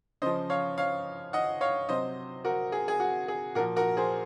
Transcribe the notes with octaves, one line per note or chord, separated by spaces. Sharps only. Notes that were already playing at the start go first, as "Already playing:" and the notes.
C#3 F3 C5 D#5
C#5 F5
C#5 F5
D#5 F#5
C#5 F5
C3 F#3 C5 D#5
F#4 A#4
G#4
G#4
F#4
G#4
A#2 F3 F#4 A#4
F#4 A#4
G#4 C5